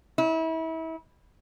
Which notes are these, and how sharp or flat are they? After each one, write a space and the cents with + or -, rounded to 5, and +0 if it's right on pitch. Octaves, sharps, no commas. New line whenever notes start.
E4 -35